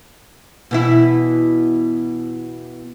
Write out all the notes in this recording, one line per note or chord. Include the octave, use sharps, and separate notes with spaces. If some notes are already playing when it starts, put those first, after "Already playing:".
B2 E3 E4